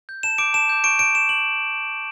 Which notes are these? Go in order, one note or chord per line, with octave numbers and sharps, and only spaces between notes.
G6
A5 E7
D6 G6 D7
A5 E7
D6 G6
C#6 D7
G6 D7
C#6 E7
F#7